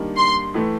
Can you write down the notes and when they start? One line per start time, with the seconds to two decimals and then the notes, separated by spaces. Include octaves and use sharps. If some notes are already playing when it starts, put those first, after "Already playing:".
Already playing: D#3 G3 A#3 D4
0.17 C6
0.54 A2 E3 A3